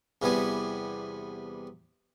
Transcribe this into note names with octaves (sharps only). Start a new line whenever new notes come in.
E2 C3 E3 G3 B3 G#5